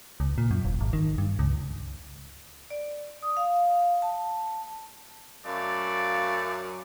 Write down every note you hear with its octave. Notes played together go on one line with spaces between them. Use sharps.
C#2
A#2
F#2
E1
G#1
D#3
G2
C#2
D5
D#6
F5
A5
F#2 A3 D5 F5